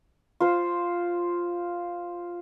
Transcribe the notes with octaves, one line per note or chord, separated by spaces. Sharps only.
F4 C5